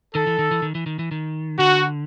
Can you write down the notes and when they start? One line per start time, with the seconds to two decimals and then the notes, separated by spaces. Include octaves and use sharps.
0.15 D#3 A4
0.27 E3
0.39 D#3
0.51 E3
0.62 D#3
0.75 E3
0.86 D#3
0.99 E3
1.11 D#3
1.59 D3 F#4